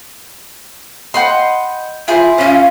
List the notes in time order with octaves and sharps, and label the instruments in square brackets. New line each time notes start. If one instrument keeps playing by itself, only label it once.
[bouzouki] D#5 G5 [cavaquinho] F#5 B5 C6
[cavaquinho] E4 G#4 C5 [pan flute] F4
[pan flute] C#4 [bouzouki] F4 C#5